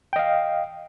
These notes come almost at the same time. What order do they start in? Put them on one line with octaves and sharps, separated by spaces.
G5 D#5 F5